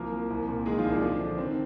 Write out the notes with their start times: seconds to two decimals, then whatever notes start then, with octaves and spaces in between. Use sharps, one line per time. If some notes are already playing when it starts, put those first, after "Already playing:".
Already playing: C2 F3 A#3 A#4
0.12 F3
0.30 C2
0.48 A#2
0.66 D#3 G#3 G#4
0.78 F3 F4
0.84 C2
0.90 D4
1.02 F3 D4
1.20 D3 D4
1.38 D#3 C4